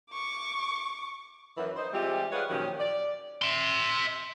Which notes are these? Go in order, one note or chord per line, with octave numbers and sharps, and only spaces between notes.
C#6 D6
F#2 E3
D#4 C5
E3 G3 G#3 C4 F4 G4
F4 G#4 B4 C#5 D5 F#5
A#2 D#3 F3 F#3 C#4 G4
D5
E5 C6